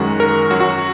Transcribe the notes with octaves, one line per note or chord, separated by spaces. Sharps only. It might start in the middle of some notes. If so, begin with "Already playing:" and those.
Already playing: F#2 D#3 G#3 F#4
A#4
F#2 F#3 F#4
F#4